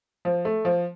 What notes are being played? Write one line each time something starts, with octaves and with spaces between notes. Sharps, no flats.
F3
A3
F3